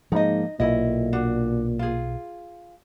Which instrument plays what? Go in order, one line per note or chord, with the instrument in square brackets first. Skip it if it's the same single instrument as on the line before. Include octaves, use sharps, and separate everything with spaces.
[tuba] G#2 [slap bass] F3 A#3 [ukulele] D#4 D#5
[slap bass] B1 [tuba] A#2 [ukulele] E4 D#5
[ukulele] D4 F#4
F4 G#4